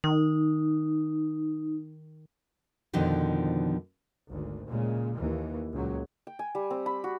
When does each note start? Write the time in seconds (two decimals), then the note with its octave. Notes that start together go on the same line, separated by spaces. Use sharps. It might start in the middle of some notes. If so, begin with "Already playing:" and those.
0.04 D#3 D#4
2.93 F2 B2 D3 D#3 F3
4.29 G#1 D2
4.68 A#2 C#3 G#3
5.17 D#2 E3
5.73 C#2 A#2 F#3
6.27 G5
6.39 G#5
6.55 G3
6.70 C4
6.86 B5
7.04 F#4